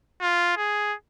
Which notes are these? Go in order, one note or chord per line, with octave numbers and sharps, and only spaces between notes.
F4
G#4